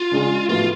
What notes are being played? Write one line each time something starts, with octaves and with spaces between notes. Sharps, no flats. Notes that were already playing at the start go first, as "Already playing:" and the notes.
Already playing: F4
C#3 G#3 D4 G#4
A2 F3 B3 F4 F#4